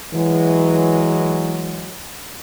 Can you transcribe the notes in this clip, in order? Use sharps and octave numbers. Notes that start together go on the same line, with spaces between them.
E3 F#3 G#3